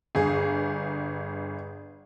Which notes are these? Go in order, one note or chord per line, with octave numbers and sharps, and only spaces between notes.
G1 G#4